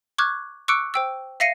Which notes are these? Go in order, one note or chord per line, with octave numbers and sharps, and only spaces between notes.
C#6 D6 F6 F#6 G#6
C#6 D6 E6 F#6 C#7 D7
C5 G5 E6
E5 F5 A#6 C7 C#7 D#7